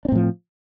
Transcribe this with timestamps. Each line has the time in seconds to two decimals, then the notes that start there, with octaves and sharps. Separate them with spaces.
0.05 D4
0.08 C4
0.12 A2
0.15 F3